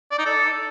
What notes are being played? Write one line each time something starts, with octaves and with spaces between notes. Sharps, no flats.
D5
D#4
A4